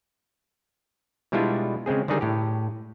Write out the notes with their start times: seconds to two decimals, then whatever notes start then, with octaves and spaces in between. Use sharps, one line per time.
1.32 B2 G3 G#3 D4 E4 F4
1.86 C#3 G#3 C4 G#4
2.08 D3 D#3 G3 D#4 G#4
2.21 A2 G4